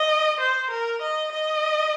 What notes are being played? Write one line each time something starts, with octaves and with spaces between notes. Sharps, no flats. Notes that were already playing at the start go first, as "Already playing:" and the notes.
Already playing: D#5
C5
A#4
D#5
D#5